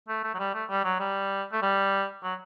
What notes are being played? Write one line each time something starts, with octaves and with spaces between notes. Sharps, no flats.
A3
A3
F#3
G3
A3
G3
F#3
G3
A3
G3
F#3